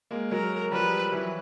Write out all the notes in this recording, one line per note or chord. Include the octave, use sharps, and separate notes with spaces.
G#3 A#3
F#3 G#3 A#4
F3 G3 B4
E3 F#3